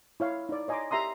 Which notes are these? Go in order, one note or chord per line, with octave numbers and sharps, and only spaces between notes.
E4 C#5 F5
D#4 D5
C#5 D#5 G#5 A#5 C6 D6
G4 E5 A#5 C6 D#6